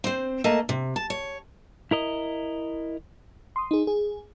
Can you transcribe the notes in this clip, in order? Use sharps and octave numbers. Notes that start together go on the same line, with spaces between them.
C4 C5
A3 A#3 D#5 A5
C3
A5
C#5
E4 A#4 D#5
C6 D#6
D#4 G#4
G#4